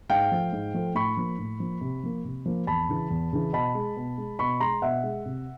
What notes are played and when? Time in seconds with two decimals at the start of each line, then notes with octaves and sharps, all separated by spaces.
0.09 G#2 F5 G5
0.31 F3 A3
0.52 G#2
0.74 F3 A3
0.95 A2 B5 C#6
1.17 F3 A#3
1.38 A2
1.60 F3 A#3
1.81 C3
2.03 F3 A#3
2.25 C3
2.46 F3 A#3
2.67 E2 A5 B5
2.89 C#3 E3
3.10 E2
3.33 C#3 E3
3.53 B2 A5 B5
3.75 G#3
3.97 B2
4.18 G#3
4.39 B2 B5 C#6
4.60 G#3 A#5 C6
4.82 B2 E5 F#5
5.04 G#3
5.25 C3